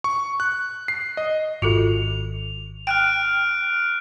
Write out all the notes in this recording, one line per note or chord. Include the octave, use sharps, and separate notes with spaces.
C#6
F#6
C7
D#5
G#1 F4 F#4 A4 F7
G5 F6 F#6 D7